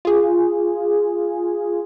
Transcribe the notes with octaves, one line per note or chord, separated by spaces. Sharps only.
F4 G#4